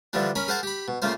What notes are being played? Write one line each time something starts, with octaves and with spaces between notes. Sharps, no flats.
D3 E3 F3 G3 D4
C#4 A#4 B5
G#4 A#4 C5 F#5 A5 A#5
G4 B5
B2
C#3 A3 A#3 F4 C5